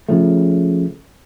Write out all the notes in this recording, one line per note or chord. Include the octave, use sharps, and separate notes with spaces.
C#3 F3 A3